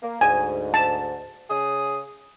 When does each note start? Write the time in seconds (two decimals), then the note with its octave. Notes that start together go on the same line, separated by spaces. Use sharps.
0.02 A#3
0.21 D2 G#2 G#5
0.74 A5
1.50 C#3 G#4 D#6